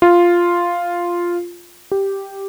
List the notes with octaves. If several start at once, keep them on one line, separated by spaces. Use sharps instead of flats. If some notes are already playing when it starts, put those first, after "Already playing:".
F4
G4